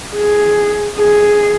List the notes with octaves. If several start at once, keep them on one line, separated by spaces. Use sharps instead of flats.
G#4
G#4